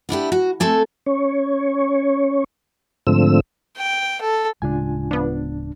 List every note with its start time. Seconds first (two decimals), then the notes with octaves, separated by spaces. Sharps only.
0.09 B3 D4 E4 G4
0.32 F#4
0.60 A3 C4 A4 G#5
1.06 C#4 C#5
3.07 G#2 D3 F3 A3 C4 E6
3.77 G5
4.21 A4
4.62 D1 C#3 G#3 D4 F4 G#5
5.11 F3 B3 D4